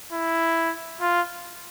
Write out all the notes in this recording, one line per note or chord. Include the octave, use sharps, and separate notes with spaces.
E4
F4